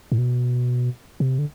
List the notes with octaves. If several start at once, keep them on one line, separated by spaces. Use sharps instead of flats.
A2
B2
C3
D3